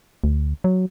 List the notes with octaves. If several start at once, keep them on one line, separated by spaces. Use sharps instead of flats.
D2
F#3